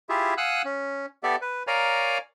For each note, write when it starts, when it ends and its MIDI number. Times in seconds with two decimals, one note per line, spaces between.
0.09 0.34 64
0.09 0.34 65
0.09 0.34 67
0.09 0.34 68
0.09 0.34 76
0.38 0.62 77
0.38 0.62 78
0.38 0.62 80
0.38 0.62 87
0.38 0.62 88
0.38 0.62 90
0.65 1.06 61
1.23 1.36 59
1.23 1.36 67
1.23 1.36 69
1.23 1.36 74
1.23 1.36 76
1.42 1.63 71
1.67 2.18 70
1.67 2.18 73
1.67 2.18 74
1.67 2.18 77
1.67 2.18 80
1.67 2.18 82